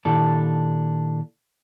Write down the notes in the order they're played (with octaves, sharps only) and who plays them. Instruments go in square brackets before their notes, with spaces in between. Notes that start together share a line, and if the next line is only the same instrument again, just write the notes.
[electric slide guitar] A#2 D#3 D4 E4 G4 A4